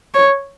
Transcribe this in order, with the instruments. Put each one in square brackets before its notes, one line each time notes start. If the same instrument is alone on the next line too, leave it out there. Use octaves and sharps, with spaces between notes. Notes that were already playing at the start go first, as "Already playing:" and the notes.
[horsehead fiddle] C#5